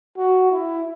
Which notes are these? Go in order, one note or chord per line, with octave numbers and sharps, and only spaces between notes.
F#4
E4